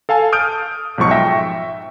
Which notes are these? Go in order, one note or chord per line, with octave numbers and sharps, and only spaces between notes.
A4 F5 G#5 A5
D#6 F6 G6 D7
B1 G#2 F3 C#6 C#7
E5 G5 C#6 A#6